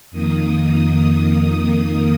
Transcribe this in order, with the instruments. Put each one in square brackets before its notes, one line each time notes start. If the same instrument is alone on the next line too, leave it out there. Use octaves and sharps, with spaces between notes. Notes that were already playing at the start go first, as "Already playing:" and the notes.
[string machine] F2 D#3 A#3 D#6